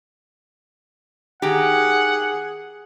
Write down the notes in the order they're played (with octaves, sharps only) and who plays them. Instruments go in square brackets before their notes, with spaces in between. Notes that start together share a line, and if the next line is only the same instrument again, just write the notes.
[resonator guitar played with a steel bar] D#3 G4 [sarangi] G#4 [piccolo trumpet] F#5